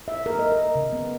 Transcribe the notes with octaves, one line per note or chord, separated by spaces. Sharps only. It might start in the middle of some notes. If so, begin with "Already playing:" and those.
E5
A#4
D#5
A#4
C#3
B3